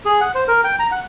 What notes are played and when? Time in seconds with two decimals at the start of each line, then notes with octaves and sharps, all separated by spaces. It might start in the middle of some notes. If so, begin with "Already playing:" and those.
0.05 G#4
0.21 F#5
0.35 C5
0.48 A#4
0.64 G5
0.79 A#5
0.92 F#5